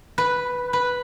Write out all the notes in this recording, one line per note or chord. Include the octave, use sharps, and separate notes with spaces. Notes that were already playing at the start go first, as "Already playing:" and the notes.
B4
B4